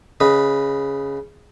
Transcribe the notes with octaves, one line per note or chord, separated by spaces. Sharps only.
C#3 B4 D#5